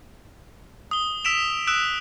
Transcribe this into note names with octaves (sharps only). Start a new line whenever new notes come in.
D#6 G7
E6 B6 D7 E7 F7
D#6 E6 F#6 D7 E7